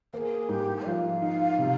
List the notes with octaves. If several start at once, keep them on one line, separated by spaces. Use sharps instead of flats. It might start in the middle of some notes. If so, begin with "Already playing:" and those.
A#3 G#4 C5
G#2 G4
F3 F5
D#4
C3